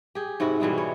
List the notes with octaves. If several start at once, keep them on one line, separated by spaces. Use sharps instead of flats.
G4 G#4
G#2 C3 E4 F#4
B2 E3 G3 G#3
C#5